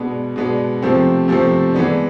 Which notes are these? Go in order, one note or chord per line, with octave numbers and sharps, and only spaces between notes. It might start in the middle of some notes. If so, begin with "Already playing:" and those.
Already playing: B2 G#3 B3 D4
B2 G#3 B3 D4
C3 F3 A3 C4
C3 F3 A3 C4
E3 G#3 B3 D4